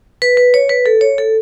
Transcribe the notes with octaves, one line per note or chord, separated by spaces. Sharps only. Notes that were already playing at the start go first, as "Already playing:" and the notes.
B4
B4
C#5
B4
A4
C#5
A4